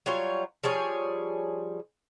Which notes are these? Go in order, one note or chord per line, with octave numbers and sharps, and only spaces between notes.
F#3 G3 F4 C#5
F3 G3 G#4 C#5